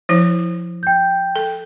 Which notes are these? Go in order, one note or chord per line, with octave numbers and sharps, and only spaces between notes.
F3 E4 C5
G5 G6
A4